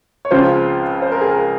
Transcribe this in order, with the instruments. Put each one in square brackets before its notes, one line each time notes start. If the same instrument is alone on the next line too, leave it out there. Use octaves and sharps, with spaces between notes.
[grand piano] C#5
[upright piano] C#2 C#3 F3 C4 F4 [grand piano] C5
[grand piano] C5
A#4
G#4
A#4